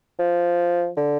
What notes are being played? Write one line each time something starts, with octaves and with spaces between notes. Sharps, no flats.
F3
D3